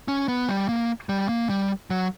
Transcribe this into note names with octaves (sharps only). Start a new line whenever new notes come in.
C#4
B3
G3
A#3
G3
A#3
G3
F#3